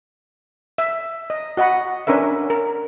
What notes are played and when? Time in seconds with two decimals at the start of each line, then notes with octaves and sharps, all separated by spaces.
0.78 E5
1.30 D#5
1.57 F#4 D#5 F#5 B5
2.07 C#4 D4 A#4 B4 E5
2.50 A#4